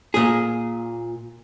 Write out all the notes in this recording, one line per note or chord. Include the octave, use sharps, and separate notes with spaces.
A#2 G#4